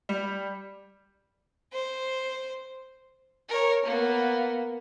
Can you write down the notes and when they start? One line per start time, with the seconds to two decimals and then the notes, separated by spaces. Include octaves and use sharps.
0.09 G3
1.73 C5
3.48 A#4 C#5
3.85 A#3 B3